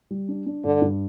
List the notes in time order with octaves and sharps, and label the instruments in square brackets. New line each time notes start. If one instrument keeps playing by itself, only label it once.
[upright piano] G3
D4
D4
[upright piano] G2 [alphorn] D3
[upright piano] G2